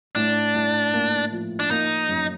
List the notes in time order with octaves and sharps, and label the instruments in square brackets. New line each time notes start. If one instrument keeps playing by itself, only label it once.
[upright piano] A2 [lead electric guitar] D4
[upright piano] A2
A#3
F3
[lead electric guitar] D4
[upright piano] A#3 [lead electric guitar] D#4
[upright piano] F#2